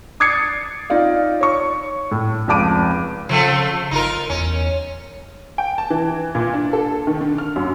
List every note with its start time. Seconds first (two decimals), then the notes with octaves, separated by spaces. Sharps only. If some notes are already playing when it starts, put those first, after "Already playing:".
0.20 D6 D#6 G#6 A6 C7 C#7
0.90 D#4 F4 D5 F5
1.41 C#5 C#6
2.11 A2
2.48 F1 C#2 A5 D6 D7 D#7
3.29 C#3 F3 A3 C4
3.91 G1 D#4 F4 A#4
4.30 E2 C#4
5.58 G5
5.78 A5
5.90 E3
6.35 A#2
6.54 D4
6.73 A4
7.07 D#3
7.21 D3
7.38 F6
7.56 F#2